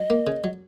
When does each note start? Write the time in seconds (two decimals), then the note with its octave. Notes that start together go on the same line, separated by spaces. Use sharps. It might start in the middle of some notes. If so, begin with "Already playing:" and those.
Already playing: F#3 D#5
0.10 A#3
0.27 C#3
0.44 F#3